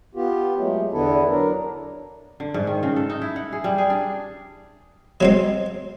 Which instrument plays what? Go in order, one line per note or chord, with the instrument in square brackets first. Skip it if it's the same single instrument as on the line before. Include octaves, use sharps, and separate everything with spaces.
[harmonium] B3 F4 G4
F#3 G#3 A3
E2 D3 B3 E4 A4
F#3 D4 A#4
[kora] D3
G#2
D#3
C#3
A4
D#4
E4
F#5
G#4
G3
G#4
D4
[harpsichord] F#3 G#3 C4